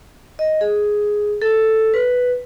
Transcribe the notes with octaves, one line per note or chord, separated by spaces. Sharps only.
D#5
G#4
A4
B4